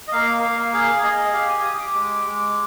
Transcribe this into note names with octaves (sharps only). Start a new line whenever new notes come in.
D#5
A#3 F5
A#3 F5
G#4 F5
G#4 D#5
G4 F5
G#5
G4 D#6
D6
G#3
G#3